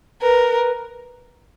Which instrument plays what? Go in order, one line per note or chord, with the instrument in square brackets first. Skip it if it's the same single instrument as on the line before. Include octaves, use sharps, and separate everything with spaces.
[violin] A#4 [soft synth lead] B4